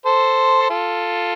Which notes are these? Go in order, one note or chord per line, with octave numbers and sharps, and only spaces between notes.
A4 C5
F4 A4